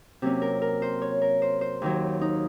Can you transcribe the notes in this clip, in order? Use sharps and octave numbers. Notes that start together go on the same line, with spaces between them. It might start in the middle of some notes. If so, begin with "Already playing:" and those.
C3 F#3 A#3 C#4
A#4
A#4
C5
C#5
A#4
C5
C5
D#2 D#3 F#3
D#4